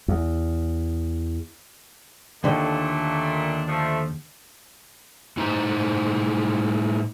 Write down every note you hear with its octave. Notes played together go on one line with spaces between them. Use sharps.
E2
D#2 A#2 D3 A3 D4
F3 A3 D4
A2 D#4 C5 A#5